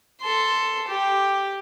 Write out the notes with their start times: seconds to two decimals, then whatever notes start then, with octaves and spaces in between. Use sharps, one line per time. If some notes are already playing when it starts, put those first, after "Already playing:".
0.22 A4 C6
0.88 G4